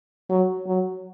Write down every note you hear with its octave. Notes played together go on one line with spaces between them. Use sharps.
F#3
F#3